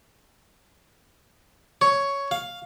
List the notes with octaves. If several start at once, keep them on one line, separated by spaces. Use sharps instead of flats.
C#5
F5